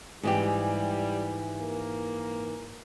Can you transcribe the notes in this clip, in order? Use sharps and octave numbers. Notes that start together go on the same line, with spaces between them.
G#2 E3 G3 G4
A#3